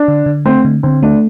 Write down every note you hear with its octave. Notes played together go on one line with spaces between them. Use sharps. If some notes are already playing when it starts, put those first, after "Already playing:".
Already playing: D4
D3
D3
A3 C4
D3
D3 C4
A3 D4